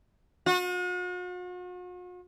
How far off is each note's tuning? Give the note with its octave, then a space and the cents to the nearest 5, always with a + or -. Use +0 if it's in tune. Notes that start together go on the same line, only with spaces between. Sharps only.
F#4 -45